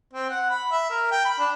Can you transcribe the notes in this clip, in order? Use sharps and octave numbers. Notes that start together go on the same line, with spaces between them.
C4
F#5
B5
E5
A#4
G5
B5
D4